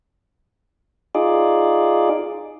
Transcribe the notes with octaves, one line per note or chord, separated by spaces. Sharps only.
D#4 F4 G#4 D5